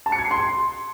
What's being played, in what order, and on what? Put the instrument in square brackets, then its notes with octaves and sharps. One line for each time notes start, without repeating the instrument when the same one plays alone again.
[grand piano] A5
C#7
G#6
C7
C6